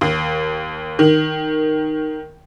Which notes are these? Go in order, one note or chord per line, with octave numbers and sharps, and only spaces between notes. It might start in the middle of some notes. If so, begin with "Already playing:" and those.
D#2
D#3